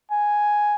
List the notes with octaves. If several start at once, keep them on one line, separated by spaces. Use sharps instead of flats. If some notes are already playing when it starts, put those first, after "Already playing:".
G#5